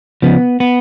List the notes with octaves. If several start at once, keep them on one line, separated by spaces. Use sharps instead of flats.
C#3 F3 B3
B3